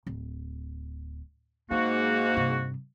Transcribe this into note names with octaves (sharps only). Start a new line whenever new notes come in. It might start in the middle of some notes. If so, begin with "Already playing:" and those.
D1
G#2 G#3 A#3 F#4
G2 C3